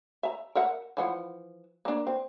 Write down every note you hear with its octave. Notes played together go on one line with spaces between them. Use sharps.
E5 A#5
A#4 E5 F#5
E3 F3 F#5
A#3 D4
C4